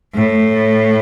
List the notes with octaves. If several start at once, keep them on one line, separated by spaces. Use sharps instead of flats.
A2